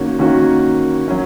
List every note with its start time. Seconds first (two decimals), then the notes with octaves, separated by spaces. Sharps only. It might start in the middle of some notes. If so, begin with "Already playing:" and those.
Already playing: D#3 A#3 C#4 F#4
0.19 D#3 A#3 C#4 F#4
1.08 F#3 C#4